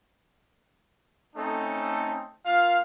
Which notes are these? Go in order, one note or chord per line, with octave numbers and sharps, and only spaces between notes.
A3 C4 C#4 D#4 A4
A#3 F4 F5